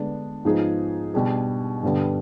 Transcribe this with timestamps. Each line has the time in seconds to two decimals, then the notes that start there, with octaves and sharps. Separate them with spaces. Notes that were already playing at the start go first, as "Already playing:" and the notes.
Already playing: D3 G#3 B3 D4
0.45 G#2 F3 B3 D#4 G#4
1.14 B2 G3 D4 G#4
1.83 G2 D3 G3 B3